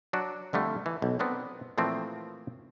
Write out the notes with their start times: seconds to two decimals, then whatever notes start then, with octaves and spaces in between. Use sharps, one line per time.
0.13 F#3 D4 F#4
0.53 F2 D3 G3 A3
0.86 E3
1.02 B1
1.19 B3 C4 D4 A#4
1.78 A#2 E3 F3 A3 C4